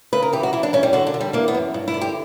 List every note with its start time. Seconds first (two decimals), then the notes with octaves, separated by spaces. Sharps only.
0.13 C#3 B4
0.22 A#4
0.33 E3 G4
0.43 F#4
0.53 E3 E4
0.63 D4
0.73 G2 C#4
0.83 G3
0.93 D3 F#4
1.07 D4
1.14 D3
1.21 G3
1.33 E3 A#3
1.48 B3
1.55 F#2
1.74 G2
1.88 E4
1.94 D3
2.01 G4